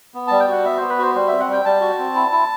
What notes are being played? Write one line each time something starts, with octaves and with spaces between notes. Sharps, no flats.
B3
G3 A5
G5
F#4 F#5
B3 E5
B3 C5
B4
F#4 C5
G3 C5
C4 E5
F#5
G3 G5
G3 A5
F#4
C4
E4
E4